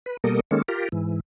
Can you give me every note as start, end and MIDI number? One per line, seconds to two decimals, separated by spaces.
0.06 0.17 71
0.24 0.40 47
0.24 0.40 55
0.24 0.40 58
0.24 0.40 69
0.24 0.40 70
0.24 0.40 87
0.51 0.62 51
0.51 0.62 56
0.51 0.62 58
0.51 0.62 61
0.51 0.62 69
0.68 0.89 65
0.68 0.89 67
0.68 0.89 70
0.92 1.20 44
0.92 1.20 52